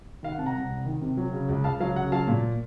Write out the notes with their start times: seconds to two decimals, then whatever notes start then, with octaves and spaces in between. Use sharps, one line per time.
0.23 D#3 F5
0.32 F#5
0.38 C3 A5
0.46 F#5 A#5
0.55 C2
0.70 C2
0.86 D#3
1.02 C3
1.17 F#3
1.33 C#3
1.49 C#2
1.64 C#2 F5 A5
1.80 F#3 F5
1.96 C#3 F#5
2.12 F#3 F5 A5
2.28 A#2